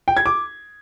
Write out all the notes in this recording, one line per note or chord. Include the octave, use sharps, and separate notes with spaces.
G5
G#6
D6